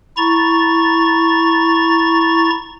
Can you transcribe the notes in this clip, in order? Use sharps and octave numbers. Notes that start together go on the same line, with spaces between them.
E4 A#5 C#6 A6